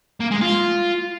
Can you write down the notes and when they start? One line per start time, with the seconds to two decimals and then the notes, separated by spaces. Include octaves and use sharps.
0.20 A#3
0.31 G#3
0.41 F4